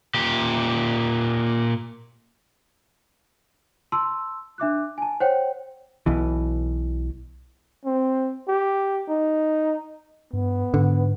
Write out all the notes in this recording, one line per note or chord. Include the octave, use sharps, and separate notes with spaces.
A#2 G4
A5 C6 E6
D4 E5 D6 F#6
G#5 A5
C5 C#5 F#5 G5
B1 B2 E3
C4
G4
D#4
G2 B3
G#2 D3